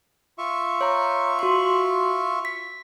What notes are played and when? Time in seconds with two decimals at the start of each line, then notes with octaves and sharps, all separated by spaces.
0.38 F4 E5 C#6
0.81 C#5 A#5
1.39 F#4 C6
2.45 B6